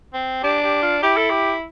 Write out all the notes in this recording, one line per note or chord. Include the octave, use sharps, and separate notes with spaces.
C4
D4 G4
G4
F4
E4 G4
A4
G4